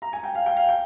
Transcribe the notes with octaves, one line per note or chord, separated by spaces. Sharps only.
A#5
G#5
G5
F5
G5
F5
G5